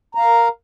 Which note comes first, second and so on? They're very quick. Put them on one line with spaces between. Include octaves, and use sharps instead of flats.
A#5 F5 A#4